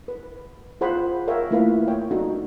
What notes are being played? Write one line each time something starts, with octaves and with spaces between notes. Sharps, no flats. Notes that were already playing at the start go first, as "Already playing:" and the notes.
B4
F4 G#4 C5 F#5 B5
A#4 C#5 E5 F5 G5
A3 A#3 E4 F4 B4 F5
C#5 G5
D4 D#4 F#4 A4